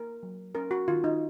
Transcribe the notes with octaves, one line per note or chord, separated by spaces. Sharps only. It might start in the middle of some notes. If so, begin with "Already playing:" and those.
Already playing: A#3 A#4
F#3
C#4 A#4
F#4
D#3 F4
D#4